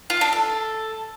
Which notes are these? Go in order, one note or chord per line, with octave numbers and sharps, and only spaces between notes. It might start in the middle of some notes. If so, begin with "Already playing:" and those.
F4
D4
A4